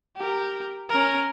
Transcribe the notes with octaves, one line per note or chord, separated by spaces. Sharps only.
G4 A#4
C#4 A#4